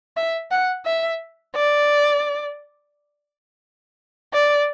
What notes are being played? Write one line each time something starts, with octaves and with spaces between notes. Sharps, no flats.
E5
F#5
E5
D5
D5